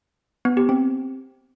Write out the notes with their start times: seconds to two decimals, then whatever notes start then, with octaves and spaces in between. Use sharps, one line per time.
0.45 B3
0.57 G4
0.69 C4